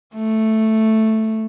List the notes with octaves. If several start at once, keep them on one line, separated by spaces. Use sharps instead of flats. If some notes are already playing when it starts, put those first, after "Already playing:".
A3